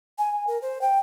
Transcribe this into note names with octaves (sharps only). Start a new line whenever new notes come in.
G#5
A#4
C5
G5